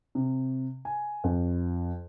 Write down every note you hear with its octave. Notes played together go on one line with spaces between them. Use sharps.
C3
G#5
F2